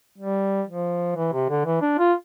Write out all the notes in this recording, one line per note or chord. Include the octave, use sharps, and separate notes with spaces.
G3
F3
E3
C3
D3
E3
D4
F4